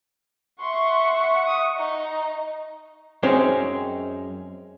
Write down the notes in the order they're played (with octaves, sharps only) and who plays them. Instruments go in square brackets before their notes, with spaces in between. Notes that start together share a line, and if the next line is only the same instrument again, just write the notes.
[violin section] E5 F#5 C#6 [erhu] C6
[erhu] D#6
D#4
[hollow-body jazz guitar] F#2 G#3 C4 C#4 D#4